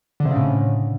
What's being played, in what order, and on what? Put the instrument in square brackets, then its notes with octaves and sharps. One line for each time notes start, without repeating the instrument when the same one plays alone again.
[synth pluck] D3
C3
C#3
A2